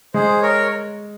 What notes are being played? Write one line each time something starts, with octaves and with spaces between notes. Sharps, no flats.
G#3 G#4 C5
A#4 C#5